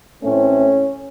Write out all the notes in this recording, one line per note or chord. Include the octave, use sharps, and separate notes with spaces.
A1 A2 E3 A3 C4 C#4